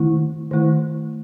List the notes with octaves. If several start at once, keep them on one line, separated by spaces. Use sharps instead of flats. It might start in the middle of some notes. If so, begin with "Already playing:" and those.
Already playing: D#3 A3 E4
D#3 A3 E4